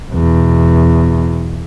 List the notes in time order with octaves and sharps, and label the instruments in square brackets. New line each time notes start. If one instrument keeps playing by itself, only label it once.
[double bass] E2 B2